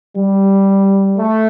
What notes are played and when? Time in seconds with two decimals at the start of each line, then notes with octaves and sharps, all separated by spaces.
0.16 G3
1.18 A3